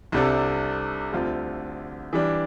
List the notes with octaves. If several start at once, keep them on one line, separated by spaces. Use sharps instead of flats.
C2 C3 G3 D4 A4
D2 D3 G3 C4 F4
E3 G3 D4